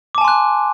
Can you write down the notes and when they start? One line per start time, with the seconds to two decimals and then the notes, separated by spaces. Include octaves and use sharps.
0.15 D6
0.18 A5
0.21 G#5
0.24 C6
0.28 F#6